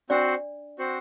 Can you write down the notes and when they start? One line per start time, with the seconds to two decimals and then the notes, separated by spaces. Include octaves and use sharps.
0.10 C4 D4 F#4 C5 D5 F#5
0.79 C4 F#4 C5 F#5